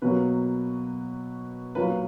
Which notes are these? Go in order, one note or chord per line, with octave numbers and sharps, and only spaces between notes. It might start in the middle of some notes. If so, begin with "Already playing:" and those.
B2 F#3 A#3 B4
A#2 F#3 A#3 B4